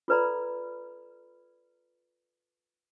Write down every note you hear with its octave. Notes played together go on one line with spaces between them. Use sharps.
F4 A4 B4 D5 A#5 B5